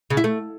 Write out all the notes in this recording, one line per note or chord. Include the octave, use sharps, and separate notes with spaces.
C#3
E4
A3